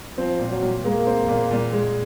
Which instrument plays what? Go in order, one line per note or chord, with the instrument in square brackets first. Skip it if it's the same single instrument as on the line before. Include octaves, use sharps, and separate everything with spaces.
[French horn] F3 [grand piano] C4
[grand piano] A#2
[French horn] F#3
[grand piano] A#2
[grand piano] G#3 [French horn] A#3
[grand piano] C4
A#2
A#2
G#3